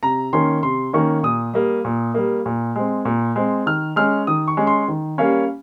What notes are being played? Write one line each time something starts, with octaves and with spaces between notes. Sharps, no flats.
C3 A#5
D#3 A#3 C#4 C6
C3 C6
D#3 A#3 C#4 C#6
A#2 D#6
G3 A#3
A#2
G3 A#3
A#2
G#3 C4
A#2
G#3 C4
D#3 F6
G#3 C#4 F6
D#3 D#6
C#6
G#3 C#4
C6
D#3
G3 A#3 C#4 F5